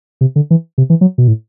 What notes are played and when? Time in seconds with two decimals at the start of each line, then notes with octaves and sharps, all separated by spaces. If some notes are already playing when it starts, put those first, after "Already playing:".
0.21 C3
0.36 D3
0.51 E3
0.78 C3
0.90 E3
1.01 F#3
1.18 B2
1.28 A2